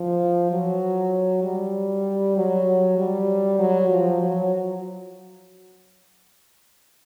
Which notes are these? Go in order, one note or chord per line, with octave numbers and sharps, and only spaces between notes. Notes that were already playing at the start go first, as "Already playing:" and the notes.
Already playing: F3
F#3
G3
F#3
G3
F#3
F3
F#3